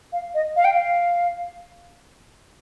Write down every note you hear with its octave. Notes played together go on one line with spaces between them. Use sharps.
F5
D#5
F5
G5
F5